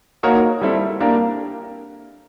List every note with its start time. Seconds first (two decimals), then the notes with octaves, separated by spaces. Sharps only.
0.23 A#3 D#4 F#4 A#4 C#5
0.61 G3 C4 E4 A4
1.00 A#3 D4 G4 A#4